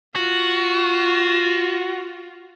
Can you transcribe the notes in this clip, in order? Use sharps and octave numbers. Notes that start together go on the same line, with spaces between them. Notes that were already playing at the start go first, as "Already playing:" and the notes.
F4 F#4